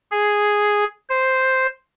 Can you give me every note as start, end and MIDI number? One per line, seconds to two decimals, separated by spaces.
0.11 0.84 68
1.09 1.67 72